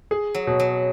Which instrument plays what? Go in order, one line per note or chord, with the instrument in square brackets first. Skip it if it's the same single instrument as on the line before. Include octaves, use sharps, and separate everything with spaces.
[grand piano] G#4
[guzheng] F#3
[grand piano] B2
[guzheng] F#3